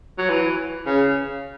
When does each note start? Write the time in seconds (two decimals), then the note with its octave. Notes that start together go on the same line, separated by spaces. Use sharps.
0.18 F#3
0.29 E3
0.86 C#3